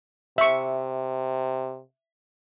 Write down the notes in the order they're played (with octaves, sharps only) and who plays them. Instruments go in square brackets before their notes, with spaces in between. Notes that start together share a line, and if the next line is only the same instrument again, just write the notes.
[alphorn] C3 [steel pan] E5 C#6